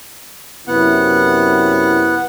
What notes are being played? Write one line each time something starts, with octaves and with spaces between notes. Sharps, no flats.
F#2 C3 B3 E4 F#5